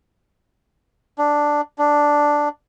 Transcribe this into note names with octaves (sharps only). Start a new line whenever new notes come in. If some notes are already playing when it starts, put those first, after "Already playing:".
D4
D4